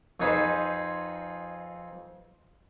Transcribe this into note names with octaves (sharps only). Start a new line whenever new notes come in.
F2 D#4 G#4 B4 C5